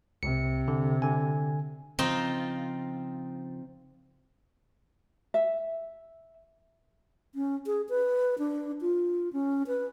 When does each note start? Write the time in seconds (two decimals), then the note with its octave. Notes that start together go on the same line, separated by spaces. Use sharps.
0.23 C2 C3 C#7
0.68 D3
1.02 D3 G#5
1.99 C#3 F3 C4 D#4 F4
5.34 E5
7.35 C#4
7.66 G#4
7.89 B4
8.38 D4
8.81 F4
9.33 C#4
9.67 B4